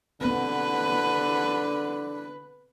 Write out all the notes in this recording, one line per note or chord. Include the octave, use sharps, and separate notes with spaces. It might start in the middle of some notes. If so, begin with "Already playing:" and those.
D3 B3 C4 B4